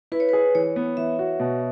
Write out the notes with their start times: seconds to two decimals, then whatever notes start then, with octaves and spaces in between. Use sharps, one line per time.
0.12 E4 B4
0.20 C#5
0.29 G#4 B4
0.55 E3 C#5
0.76 B3
0.97 E3 E5
1.19 F#4
1.40 B2